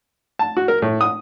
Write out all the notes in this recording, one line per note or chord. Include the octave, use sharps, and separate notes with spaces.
A5
F#4
A#4
A2
D#6